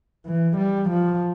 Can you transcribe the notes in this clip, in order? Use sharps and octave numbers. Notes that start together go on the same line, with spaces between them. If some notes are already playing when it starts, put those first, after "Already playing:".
E3
G3
F3